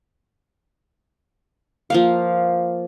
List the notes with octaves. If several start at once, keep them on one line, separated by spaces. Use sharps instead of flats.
F3 A#3 F5